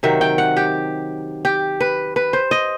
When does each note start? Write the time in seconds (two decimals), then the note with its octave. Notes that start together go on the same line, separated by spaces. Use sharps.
0.03 C3 D#3 F#3 E5
0.21 G5
0.38 F#5
0.57 G4
1.45 G4
1.80 B4
2.16 B4
2.33 C5
2.51 D#5